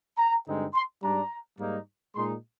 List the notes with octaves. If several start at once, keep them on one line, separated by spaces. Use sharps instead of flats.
A#5
G2 D3 G#3 C4 D#4
C6
G#2 G3 D4 A#5
G#2 G3 A#3 D#4
A#2 G#3 D#4 C6